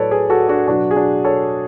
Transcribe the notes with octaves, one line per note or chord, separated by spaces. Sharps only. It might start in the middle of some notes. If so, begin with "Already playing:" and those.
Already playing: A2 F#3 A4 B4 C#5 D5
G#4 B4
F#4 A4
D4 F#4
B2 F#3 D4 F#4
G#4
D4 F#4
A4 C#5